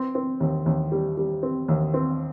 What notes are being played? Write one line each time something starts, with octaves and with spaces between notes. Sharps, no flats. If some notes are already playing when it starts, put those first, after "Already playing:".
Already playing: C4
C4
D#2
D#2
G3
G3
C4
D#2
C4